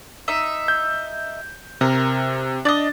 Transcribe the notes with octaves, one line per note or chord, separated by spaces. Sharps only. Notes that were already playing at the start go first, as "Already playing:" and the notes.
D#4 E5
G6
C3 A#4
D4 D5 D#5 A6